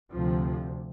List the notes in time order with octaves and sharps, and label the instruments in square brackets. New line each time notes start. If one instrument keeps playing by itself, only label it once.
[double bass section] D2 C3 F3